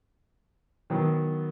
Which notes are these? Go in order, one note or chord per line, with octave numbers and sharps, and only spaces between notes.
D#3 F#3 B3